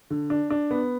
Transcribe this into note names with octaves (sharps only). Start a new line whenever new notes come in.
D3
D4
D4
B3